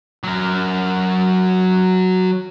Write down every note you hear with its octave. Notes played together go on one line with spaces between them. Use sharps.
F#3 A#4